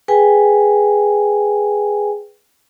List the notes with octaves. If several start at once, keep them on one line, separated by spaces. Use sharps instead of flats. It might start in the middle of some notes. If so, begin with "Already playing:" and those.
G#4 B4 G5 G#5